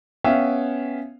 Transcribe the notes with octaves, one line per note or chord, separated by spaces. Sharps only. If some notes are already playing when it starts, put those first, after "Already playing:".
B3 C#4 E5 F5 G5